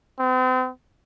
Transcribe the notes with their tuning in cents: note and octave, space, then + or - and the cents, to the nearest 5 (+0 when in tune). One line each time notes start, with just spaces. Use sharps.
C4 -40